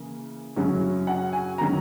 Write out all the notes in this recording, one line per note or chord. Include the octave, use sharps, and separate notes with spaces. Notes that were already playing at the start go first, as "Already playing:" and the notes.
Already playing: C#3 E3 A#3
F#2 C#3 F#3 C#4 E4
F#5
G#5
D#3 F#3 C#4 A#5